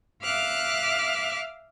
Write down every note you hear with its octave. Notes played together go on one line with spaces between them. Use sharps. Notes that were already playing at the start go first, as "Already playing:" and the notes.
E5 F5 D6 F6 F#6